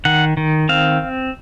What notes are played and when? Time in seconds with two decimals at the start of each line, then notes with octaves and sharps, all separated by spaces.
0.05 D#3 F#5
0.37 D#3
0.69 C4 F5